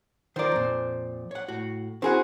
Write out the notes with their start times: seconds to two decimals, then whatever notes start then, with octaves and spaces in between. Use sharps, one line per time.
0.36 D#3 F4 A#4 C5 D5
0.52 F2 A#2
1.31 C#5 F#5
1.48 A2 F#4
2.02 C4 E4 F#4 G#4 A#4 C5